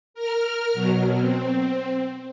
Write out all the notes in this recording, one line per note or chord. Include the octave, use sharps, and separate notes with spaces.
A#4 F6
B2 F#3
C4